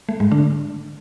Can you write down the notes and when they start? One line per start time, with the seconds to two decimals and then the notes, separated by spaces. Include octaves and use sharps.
0.09 A3
0.20 G#2 G#3
0.31 D3 D4